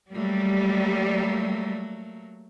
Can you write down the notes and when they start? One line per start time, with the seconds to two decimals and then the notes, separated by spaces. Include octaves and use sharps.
0.13 F#3 G3 A3 A#3